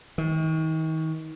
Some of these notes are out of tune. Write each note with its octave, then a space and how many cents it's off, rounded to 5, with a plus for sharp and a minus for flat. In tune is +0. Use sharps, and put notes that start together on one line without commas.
D#3 +35